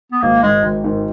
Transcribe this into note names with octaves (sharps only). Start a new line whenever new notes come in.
B3
G#1 A#3
G#2 D#3 G#3
G#1
G#2 D#3